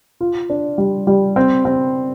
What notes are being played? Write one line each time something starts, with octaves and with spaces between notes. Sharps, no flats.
F4
D4
G3
G3
C4
C4